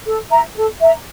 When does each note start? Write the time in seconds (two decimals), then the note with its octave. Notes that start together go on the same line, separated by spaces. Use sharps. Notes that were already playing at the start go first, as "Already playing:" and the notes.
0.06 A4
0.31 E5 A#5
0.55 A4
0.81 E5 A#5